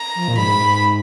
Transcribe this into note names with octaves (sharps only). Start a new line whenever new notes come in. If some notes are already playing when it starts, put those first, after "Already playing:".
Already playing: A#5
F3
A#2
G#2 B5
G#2